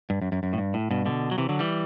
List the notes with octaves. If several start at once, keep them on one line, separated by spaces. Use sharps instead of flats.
G2
F#2
F#2
F#2
A2
G2
A2
G2 B2
B2 D3
F#3
C3 E3
D3 F#3
E3 G3